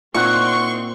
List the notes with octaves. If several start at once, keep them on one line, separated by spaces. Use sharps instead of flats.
A#2 C4 D#4 E4 F#5 C6 C#6